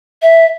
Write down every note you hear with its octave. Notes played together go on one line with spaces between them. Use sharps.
E5